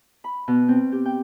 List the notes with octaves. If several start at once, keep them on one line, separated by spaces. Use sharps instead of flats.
B5
B2
C4
G4
G5